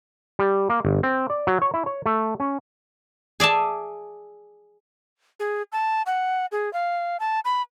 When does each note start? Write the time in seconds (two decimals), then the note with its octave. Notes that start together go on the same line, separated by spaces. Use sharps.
0.39 G3
0.70 A#3
0.85 G1
1.03 C4
1.30 D5
1.47 F#3
1.62 C#5
1.74 E4
1.86 C#5
2.06 A3
2.40 C#4
3.40 G#4 D5 E5 A5
5.40 G#4
5.72 A5
6.06 F#5
6.52 G#4
6.73 F5
7.20 A5
7.45 B5